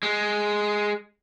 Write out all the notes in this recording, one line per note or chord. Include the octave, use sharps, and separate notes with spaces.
G#3